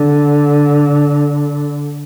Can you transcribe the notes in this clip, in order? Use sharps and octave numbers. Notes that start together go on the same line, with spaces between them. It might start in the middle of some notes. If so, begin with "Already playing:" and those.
Already playing: D3